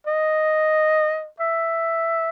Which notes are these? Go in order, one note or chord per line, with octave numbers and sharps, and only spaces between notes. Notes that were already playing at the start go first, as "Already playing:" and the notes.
D#5
E5